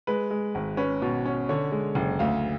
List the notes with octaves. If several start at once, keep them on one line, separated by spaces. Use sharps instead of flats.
G#3 B4
G#3
G#1
C#4 B4
B2
C#4
D3 C#5
G#3
F#1
D2 F5